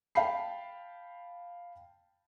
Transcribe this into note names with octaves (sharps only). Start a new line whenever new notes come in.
F5 G5 A5 B5 C7